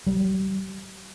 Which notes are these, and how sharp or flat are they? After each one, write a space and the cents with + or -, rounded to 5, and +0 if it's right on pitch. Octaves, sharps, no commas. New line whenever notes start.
G3 -30